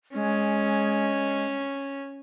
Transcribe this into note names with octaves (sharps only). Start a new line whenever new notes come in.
G#3 C#4